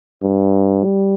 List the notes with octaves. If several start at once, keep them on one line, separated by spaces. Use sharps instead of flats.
G2
G3